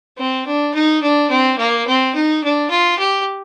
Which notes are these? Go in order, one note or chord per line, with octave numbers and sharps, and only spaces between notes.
C4
D4
D#4
D4
C4
A#3
C4
D#4
D4
F4
G4